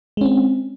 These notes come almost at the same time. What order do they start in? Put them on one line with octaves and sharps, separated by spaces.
G#3 C#4 C4